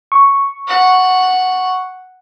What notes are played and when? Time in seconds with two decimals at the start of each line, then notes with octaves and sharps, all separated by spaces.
0.12 C#6
0.67 F#5